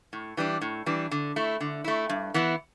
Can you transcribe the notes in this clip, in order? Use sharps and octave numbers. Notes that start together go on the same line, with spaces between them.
A2
E3 G3 D4
A2
E3 G3 D4
D3
A3 E4
D3
A3 E4
G2
E3 B3 E4